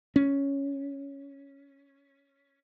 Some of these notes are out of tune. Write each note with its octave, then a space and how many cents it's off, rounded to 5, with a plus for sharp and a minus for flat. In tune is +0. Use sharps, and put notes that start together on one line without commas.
C#4 +5